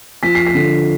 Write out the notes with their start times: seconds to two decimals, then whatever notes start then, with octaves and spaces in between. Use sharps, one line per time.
0.23 F3 B6
0.35 C7
0.47 B6
0.54 D3